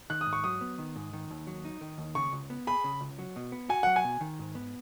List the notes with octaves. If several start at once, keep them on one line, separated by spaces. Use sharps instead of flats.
D#3 F#6
D#6
G#2
C#6
F#3 D#6
B3
D#3
G#2
D#3
D#2
F#3
D#4
D#3
D#2
C#3 C#6
C#2
B3
G#4 B5
C#3
C#2
F#3
B2
B3
F#4 G#5
F#3 F#5
G#5
B2
D#3
G#2
B3